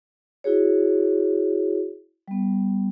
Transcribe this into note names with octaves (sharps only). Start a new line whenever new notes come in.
E4 F#4 G#4 C#5
G3 B3